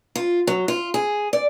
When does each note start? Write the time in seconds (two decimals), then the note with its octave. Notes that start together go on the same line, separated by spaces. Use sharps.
0.16 F4
0.47 F#3
0.68 F4
0.94 G#4
1.33 D5